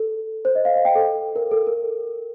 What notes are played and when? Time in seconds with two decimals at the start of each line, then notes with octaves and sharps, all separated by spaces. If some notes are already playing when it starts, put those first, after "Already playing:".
Already playing: A4
0.45 C5
0.55 D#5
0.65 F5
0.75 F5
0.85 G5
0.95 A4
1.36 A#4
1.51 A4
1.67 A#4